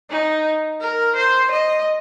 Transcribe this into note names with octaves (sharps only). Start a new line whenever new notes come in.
D#4
A#4
C5
D#5